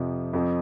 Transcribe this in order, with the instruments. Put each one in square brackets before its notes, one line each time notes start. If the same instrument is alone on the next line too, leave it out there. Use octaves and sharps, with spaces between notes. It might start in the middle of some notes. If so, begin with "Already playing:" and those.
Already playing: [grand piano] F2 C3 F3
F2 F3 C4